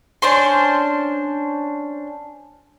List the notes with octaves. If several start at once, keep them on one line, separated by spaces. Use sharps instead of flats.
C#4 D4 C5 C6